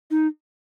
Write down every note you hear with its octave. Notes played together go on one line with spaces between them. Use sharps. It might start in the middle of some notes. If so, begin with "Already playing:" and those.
D#4